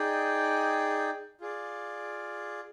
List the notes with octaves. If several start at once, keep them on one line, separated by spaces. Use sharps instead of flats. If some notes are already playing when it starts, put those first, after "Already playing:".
Already playing: D#4 G#4 D5 G5
F4 G#4 D5